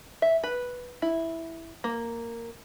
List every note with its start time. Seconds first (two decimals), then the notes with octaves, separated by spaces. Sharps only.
0.22 E5
0.43 B4
1.02 E4
1.84 A#3